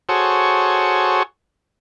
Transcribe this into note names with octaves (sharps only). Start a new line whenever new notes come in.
F#4 G#4 A4 C5 C#5